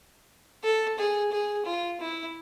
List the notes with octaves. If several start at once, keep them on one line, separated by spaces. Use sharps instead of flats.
A4
G#4
G#4
F4
E4